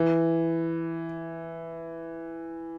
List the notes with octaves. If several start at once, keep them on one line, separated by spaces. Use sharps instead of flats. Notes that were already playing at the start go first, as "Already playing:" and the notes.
Already playing: E3